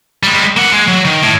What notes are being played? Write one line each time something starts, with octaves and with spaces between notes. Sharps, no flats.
G3 G#3
A#3 F#5
G#3
F#3
D#3
A2